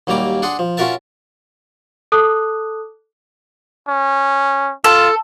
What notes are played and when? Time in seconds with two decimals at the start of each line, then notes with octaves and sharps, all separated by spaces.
0.07 D#2 F#3 G3 A#3 A#5 D6
0.42 D4 G#4 F#5 C6
0.59 F3
0.77 C#4 F4 F#4 A#4 E5 A5
2.12 A4 A5 D6 D#6 F#6
3.89 C#4
4.84 F4 A4